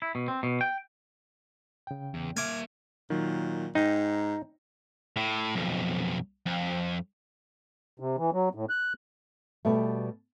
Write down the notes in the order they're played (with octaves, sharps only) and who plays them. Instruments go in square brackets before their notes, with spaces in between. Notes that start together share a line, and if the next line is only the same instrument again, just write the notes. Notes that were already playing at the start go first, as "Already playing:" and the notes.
[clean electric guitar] E4
B2
C4
B2
G5
[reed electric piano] C#3 G5
[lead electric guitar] E2
[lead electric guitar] A#3 E5 [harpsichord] G#5 D6 [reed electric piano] F6
[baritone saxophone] A#2 [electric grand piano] D#3 F#3
[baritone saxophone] G#2 [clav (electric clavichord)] D#4 [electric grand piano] G5 A#5
[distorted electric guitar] A2
B1 F2
F2
[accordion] C3
E3
F#3
A2
F#6
[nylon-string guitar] B2 G3 A3